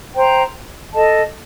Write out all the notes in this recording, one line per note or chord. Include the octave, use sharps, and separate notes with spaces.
C5 G5 A#5
A4 D#5 A5